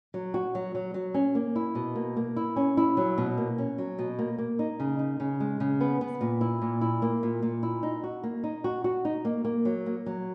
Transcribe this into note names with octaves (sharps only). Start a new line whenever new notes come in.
F#3
F#4
F#3
F#3
F#3
C#4
A#3
E4
B2
A#3
A#3
E4
C#4
E4
F#3
B2
A#3
C#4
F#3
B2
A#3
A#3
D#4
C#3
D#4
C#3
G#3
C#3
B3
B3
A#2
E4
A#2
E4
A#3
A#2
A#2
E4
D#4
F#4
A#3
D#4
F#4
F#4
D#4
A#3
A#3
F#3
A#3
F#3